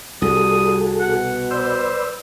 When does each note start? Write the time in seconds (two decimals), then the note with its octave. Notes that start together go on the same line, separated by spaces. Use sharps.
0.22 C2 G3 F#4 G#4 A4 D#6
1.00 B2 F#5
1.51 B4 C5 D5 E6